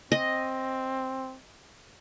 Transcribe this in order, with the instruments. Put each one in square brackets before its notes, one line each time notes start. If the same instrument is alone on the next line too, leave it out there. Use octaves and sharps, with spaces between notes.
[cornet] C4 [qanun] D#5